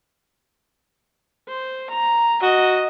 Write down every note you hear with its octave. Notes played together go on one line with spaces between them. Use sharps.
C5
A#5
F#4 D#5